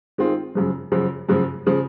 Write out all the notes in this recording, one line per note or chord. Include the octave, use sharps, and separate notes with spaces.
D#3 G#3 C4 F4
F#2 C#3 F3
F#2 C#3 F3
F#2 C#3 F3
C#3 F3